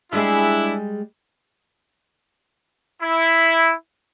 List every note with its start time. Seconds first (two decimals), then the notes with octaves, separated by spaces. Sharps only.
0.13 G3 G#3 D4 E4 G#4
3.02 E4